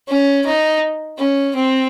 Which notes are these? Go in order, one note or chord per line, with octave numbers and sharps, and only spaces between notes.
C#4
D#4
C#4
C4